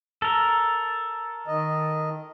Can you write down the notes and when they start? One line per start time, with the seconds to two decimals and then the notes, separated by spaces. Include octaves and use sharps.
0.22 A4 A#4
1.47 D#3 D#5